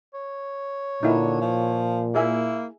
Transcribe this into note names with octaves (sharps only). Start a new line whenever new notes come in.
C#5
A#2 D3 D#4 E4
F3
A#3 E4 G#4 E5 G#5